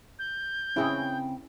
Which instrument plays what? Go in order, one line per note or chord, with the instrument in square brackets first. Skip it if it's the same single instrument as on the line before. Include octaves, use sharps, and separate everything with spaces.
[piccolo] G6
[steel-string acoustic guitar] C#3 C4 G5 [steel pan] C#4 E4 G#4